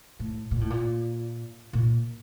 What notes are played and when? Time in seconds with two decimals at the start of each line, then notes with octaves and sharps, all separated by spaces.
0.20 A2
0.51 A#2
0.61 A2
0.70 A#2
1.73 A#2